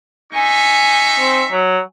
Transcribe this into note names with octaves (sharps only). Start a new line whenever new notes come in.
D#4 E5 G#5 C#6
C4
F#3